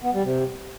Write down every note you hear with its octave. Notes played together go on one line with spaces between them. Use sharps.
B3
G3
C3